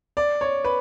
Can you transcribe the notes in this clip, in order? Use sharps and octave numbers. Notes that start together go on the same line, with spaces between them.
D5
C#5
B4